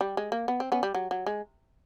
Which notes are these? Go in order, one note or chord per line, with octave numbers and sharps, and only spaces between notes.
G3
G#3
A#3
B3
C4
B3 C#4
G3
F#3
F#3
G#3